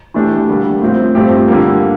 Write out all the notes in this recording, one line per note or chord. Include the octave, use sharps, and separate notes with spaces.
E3 A3 D4 G4
D3 G3 A#3
A2 F3 C4
G2 F3 A3 C4 G4
D3 G3 A#3